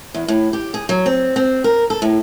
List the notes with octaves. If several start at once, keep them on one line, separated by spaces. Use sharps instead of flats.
E2
A2
G4
G#4
F#3
C4
C4
A#4
A4
A2